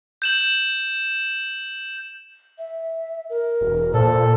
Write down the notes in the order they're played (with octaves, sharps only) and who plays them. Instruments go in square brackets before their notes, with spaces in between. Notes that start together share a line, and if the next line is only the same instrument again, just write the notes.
[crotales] G6 E7 F#7
[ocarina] E5
A#4
[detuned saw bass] E1
[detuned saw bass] A#2 [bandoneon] A4 [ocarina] C5